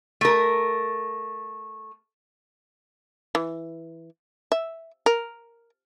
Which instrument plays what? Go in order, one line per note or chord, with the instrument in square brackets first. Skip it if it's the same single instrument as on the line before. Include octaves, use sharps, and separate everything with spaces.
[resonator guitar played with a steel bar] A3 A#4
[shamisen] E3
E5
A#4